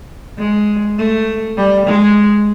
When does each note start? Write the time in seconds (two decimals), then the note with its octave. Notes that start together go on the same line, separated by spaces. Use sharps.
0.39 G#3
0.98 A3
1.57 G3
1.86 G#3